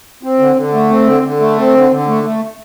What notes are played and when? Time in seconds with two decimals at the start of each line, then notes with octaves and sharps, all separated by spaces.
0.23 C4
0.39 D3
0.56 D3
0.73 A3
0.90 C4
1.07 D3
1.23 D3
1.40 A3
1.58 C4
1.74 D3
1.91 D3
2.07 A3
2.24 A3